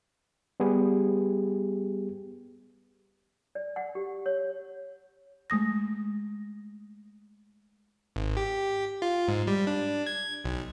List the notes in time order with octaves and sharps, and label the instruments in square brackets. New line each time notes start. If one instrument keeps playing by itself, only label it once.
[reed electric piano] G3 B3 G4 G#4
[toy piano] D5
F#5
G4
C#5
[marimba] G#3 A3 D#6 A#6
[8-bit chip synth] G#1
G4
F4
G#2
G3
D4
G#6
B1